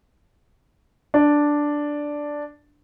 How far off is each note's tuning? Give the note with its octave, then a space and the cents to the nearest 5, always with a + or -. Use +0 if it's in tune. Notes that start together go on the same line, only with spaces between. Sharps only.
D4 +0